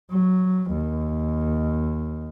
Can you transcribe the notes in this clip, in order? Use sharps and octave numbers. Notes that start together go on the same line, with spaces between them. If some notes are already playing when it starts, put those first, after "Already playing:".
F#3
D#2